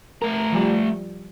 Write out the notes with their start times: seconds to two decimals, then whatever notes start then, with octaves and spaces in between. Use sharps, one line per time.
0.22 A3 A#4 A#5
0.52 F3 G3